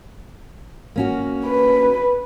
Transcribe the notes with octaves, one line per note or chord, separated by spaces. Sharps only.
A#3 C#4 F#4
B4